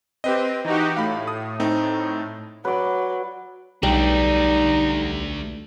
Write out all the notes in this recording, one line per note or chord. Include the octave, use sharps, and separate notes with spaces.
C4 G4 B4 D#5
E3 D#4 F#4 G4
A2 F5 B5
D#6
A3 C4 D#4
F#3 B4 D5
B1 G3 A3 D4 D#4